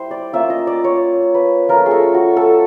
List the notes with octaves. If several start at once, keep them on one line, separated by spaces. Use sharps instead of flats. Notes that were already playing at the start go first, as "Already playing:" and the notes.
Already playing: G3 E4 C5
D5
A#3 C#4 F4 E5
D#5
D5
C#5
B4
F3 A3 C#4 A#4
G#4
A4
F#4
A4